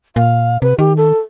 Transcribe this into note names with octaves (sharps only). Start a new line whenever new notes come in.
A#2 F5
C3 B4
D#3 G4
A4